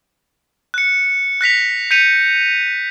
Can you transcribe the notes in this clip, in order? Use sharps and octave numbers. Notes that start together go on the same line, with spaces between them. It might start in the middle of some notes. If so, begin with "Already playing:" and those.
F#6 C#7
F#6 A#6 B6 F7
G6 B6 C#7 D#7 F7